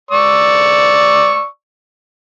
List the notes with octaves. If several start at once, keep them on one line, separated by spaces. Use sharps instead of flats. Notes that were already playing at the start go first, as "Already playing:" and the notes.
D5 C#6 E6